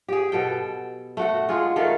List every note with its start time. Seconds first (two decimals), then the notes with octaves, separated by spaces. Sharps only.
0.08 G4 G#4
0.32 B2 A4 G5
1.17 A3 F#4 F#5
1.49 G#3 F4 G#4 F#5
1.76 D#3 A3 A4 F5